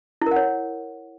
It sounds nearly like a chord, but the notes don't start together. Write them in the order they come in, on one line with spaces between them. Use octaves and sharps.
E4 A#4 F#5 C#5